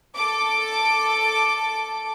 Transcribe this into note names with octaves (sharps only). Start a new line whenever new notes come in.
A4 D6